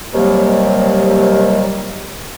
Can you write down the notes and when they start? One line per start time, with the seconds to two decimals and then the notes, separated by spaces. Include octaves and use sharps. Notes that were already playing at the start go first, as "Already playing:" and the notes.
0.13 D#2 C3 D#3 F#3 G3 A#3